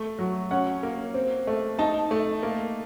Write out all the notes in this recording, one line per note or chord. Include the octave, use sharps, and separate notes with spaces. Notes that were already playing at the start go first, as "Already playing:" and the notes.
Already playing: A3
F#3
C#4 F#5
A#3
C4
A3
D#4 A5
A3
A#3